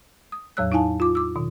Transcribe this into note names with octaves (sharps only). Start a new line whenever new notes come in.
D#6
E2 A2 F#3 C#5 E6 F#6
D#4 E4 F5 G#5 A5
F4 D6
D6 E6
B2 D#3